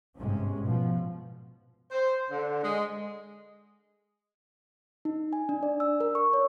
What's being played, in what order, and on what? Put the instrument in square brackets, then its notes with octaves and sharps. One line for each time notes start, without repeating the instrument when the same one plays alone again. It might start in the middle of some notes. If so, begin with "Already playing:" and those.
[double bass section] G1 G#2 C3 G#3 C#4
B2 F3
[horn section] C5
D3
G#3
[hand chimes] D#4
G#5
D4
D5
E6
A#4
C#6
C#5